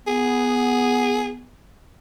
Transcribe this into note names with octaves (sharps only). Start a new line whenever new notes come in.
B3 G#4